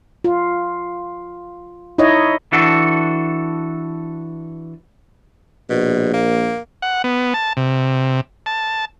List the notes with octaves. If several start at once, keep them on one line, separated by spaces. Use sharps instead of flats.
F4
D#4 E4 C#5 D#5
E3 D4 F#4 A4
A#1 B2
A#3
F#5
B3
A5
C3
A5